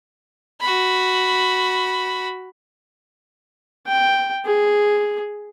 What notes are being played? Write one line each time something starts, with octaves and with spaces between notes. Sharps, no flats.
F#4 B5
G5
G#4